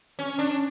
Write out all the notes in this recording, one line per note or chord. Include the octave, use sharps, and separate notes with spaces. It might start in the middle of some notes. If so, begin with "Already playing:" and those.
C#4
D4